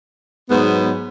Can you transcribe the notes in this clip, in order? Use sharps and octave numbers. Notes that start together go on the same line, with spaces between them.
G#2 F#3 B3